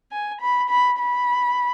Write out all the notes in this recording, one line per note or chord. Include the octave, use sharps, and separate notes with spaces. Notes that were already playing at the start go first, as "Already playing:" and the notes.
G#5
B5
B5
B5